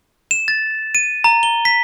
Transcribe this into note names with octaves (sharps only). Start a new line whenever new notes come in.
E7
A6
D#7
A#5
G7
B6